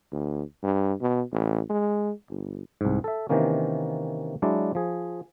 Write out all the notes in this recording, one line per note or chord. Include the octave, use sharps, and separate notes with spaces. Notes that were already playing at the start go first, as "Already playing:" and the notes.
D2
G2
B2
A1
G#3
G1
C2 G#2
A4 E5
C3 D#3 E3 A#3 C#4
F#3 G#3 D4 E4 D5
F3 G#4